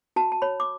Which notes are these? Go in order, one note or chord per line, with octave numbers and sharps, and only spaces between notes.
F#4 A5
A5
C#5 B5
D6